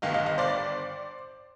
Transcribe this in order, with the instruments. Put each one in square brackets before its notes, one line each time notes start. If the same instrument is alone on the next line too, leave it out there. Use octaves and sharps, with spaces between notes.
[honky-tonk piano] G1 G2 D#3 D#5 F5
D#5 F5
D#5 F5
C5 D5